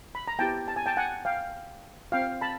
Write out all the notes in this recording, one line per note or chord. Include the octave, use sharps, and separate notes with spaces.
B5
A#5
B3 E4 G4 G5 A5
A5
G#5
G5 A5
F#5 G#5
F5 G5
C4 F4 F5 G5
A5 B5